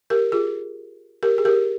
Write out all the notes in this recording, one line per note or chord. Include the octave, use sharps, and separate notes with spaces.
G4 A#4
F4 G#4
G4 A#4
G#4
G4 A#4